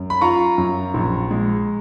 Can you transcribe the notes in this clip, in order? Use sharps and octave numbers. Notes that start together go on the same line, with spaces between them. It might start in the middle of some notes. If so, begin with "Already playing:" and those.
Already playing: F#2
B5
F4 A#5 C#6
F#2
A#1
G#3